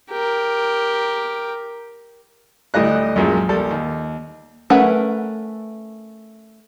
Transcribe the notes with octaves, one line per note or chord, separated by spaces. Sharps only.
G4 A#4
D2 A2 G3 D#5 F#6
A#1 F#2 F3 G#3
A#1 G3 A4
D#2
A3 C#4 A#4 B4 F#5